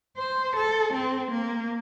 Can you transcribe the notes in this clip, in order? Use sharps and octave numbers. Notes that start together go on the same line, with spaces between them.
C5
A4
C4
A#3